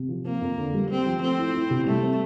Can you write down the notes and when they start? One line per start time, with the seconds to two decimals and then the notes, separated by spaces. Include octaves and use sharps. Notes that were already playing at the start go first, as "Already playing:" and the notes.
Already playing: C3
0.09 F3
0.25 A#3 C4
0.41 F2
0.58 D3
0.74 G3
0.90 C4 G4
1.06 F3
1.22 A3 C4
1.38 E4
1.54 E4
1.70 C3
1.86 G3 A3
2.02 C4